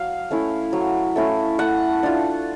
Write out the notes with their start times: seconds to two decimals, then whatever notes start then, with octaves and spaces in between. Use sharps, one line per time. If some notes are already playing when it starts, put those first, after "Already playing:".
Already playing: F#3 F5
0.31 A3 C#4 E4
0.73 F#3
1.16 A3 C#4 E4
1.59 A3 F#5
2.03 D4 F4